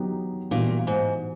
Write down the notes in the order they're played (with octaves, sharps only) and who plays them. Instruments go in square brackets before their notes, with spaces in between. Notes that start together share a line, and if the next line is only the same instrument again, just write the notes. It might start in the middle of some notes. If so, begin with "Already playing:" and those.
Already playing: [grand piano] D#3 F#3 B3 D#4 G4
[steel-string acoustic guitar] A#2 [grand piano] E3 G3 B3 D4 F#4
[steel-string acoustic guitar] G#2